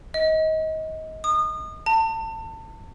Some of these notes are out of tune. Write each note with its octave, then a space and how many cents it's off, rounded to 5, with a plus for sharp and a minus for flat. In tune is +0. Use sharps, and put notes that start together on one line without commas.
D#5 +25
D#6 -30
A5 +30